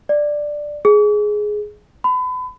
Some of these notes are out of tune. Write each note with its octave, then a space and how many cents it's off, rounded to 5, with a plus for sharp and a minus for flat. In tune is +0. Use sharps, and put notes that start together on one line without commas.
D5 +5
G#4 +10
B5 +35